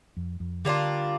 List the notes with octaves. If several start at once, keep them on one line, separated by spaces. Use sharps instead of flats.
F2
F2
D3 G3 A#3 D4 F4